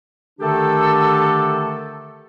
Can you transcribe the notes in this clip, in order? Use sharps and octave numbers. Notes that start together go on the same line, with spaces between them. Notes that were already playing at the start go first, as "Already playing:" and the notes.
D3 D#3 A3 D4 G4 A4